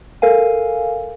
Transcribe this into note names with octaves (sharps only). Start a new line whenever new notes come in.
A4 A#4 F5 G#5